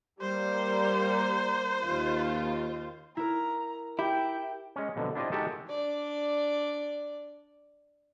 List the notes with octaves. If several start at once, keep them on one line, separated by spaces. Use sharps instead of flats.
G3 A#3 C5
D#2 F4
E4 A#4 A#5
E4 G4 G5
G#3 C#4
F2 B2 D3 F#3
D4 E4 F4 G4 C5 D#5
G#3 D#4 F#4 G4 A4 A#4
D4 D5